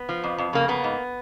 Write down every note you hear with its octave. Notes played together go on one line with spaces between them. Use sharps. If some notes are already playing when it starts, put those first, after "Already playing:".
Already playing: B3
F3
F2
F2
C#3 A#3
A#3 B3
G#2